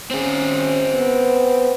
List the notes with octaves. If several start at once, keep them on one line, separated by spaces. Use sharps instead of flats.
C4 C#4 G#4
B3